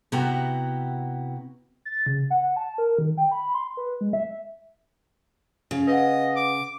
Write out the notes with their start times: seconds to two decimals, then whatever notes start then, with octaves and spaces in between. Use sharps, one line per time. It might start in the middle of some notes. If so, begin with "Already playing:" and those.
0.12 C3 B3 E4 F#4 G4 A#5
1.85 A6
2.06 C#3
2.30 F#5
2.56 A5
2.78 A#4
2.99 D#3
3.18 G5
3.31 B5
3.54 C6
3.77 B4
4.01 G#3
4.13 E5
5.71 C#3
5.87 B4 D#5 F5 F#5
6.36 D6